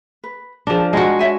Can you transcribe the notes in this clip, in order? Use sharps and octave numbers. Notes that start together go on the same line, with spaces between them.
B4
F3 D4 G#4 A#4
G#3 F4 F#4 G5 A#5
C#5 E5 G#5